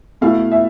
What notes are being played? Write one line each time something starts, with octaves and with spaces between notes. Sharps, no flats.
B2 A3 E4 F5
E5